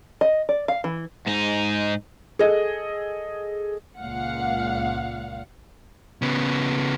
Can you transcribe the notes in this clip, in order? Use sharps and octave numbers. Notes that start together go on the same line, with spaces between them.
D#5
D5
F5
E3
G#2 D#4
G#4 A4 D#5
C#2 A#2 F5 F#5
C#3 B3